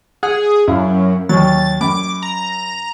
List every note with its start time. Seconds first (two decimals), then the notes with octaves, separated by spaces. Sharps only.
0.23 G#4 F#5
0.68 F#2 E4 F5
1.29 D#2 F#3 A6
1.81 F#2 B5 D6
2.22 A#5